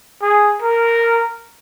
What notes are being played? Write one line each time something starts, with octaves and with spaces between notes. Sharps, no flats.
G#4
A#4